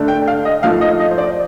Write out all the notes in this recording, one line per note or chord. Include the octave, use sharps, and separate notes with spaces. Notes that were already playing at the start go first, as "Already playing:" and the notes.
Already playing: D3 A3 D4
G5
F5
D#5
F3 A3 D#4 F5
D#5
D#5
C5
D5